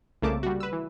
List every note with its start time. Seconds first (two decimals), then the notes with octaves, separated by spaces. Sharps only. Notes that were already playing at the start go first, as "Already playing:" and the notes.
0.22 C2 C#3 A3 A#3 A5 D6
0.43 G3 F#4
0.60 B4 E6
0.73 E3